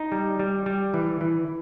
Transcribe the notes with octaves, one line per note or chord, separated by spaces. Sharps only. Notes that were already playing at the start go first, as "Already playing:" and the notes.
Already playing: D#4
G3
G3
G3
E3
E3